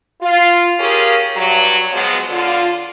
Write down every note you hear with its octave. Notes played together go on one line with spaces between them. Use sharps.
F4
C#4 F4 G4 G#4 A#4
G2 F#3
F3 F#3 G#3 B3
D3 F4